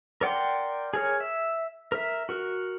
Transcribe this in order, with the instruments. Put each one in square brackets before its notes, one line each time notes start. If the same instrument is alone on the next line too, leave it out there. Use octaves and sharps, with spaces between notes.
[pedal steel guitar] A#4 D5 F#5 G5 C6
G#4 A#4 C#5
E5
A#4 E5
F#4 A#4